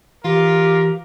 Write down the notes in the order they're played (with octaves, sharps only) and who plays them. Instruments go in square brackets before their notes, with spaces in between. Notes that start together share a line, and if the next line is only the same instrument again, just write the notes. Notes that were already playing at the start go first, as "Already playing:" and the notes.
[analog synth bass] E3 [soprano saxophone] F4 [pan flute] G4 [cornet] A#4